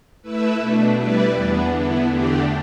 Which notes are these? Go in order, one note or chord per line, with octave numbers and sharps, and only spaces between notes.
A3 E4 B4 E5
B2 A3 D4
G3 E4 B4 D5
E2 E3 B3 D4
D3 B3 E4
E2 D3 A3 D4 G4